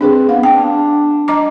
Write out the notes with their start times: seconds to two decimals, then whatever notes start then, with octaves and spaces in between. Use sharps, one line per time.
0.01 C4 D4 G#4 B4
0.29 B3 F5
0.43 D4 G5
1.28 D#5 A#5 D6